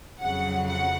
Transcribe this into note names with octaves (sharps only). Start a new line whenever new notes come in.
F2 C#3 F#3 F#5
F#5